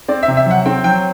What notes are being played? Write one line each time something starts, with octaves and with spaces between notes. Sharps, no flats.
C4 D5
E5
C3
E5
F#3 F#5
C4 G5
F#3 G5